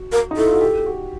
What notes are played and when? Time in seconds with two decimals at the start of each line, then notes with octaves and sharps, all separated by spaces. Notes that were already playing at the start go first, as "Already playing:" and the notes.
Already playing: F#4
0.12 A#4
0.31 D#4
0.37 E4 A4
0.46 F4
0.53 F#4
0.61 G4
0.86 F#4